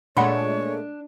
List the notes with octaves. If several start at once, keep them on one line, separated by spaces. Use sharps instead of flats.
A#2 G#3 A3 D4 C#5 F#5 B5 C6